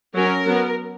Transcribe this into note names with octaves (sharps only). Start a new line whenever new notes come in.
F#3 C#4 A#4
F#3 B3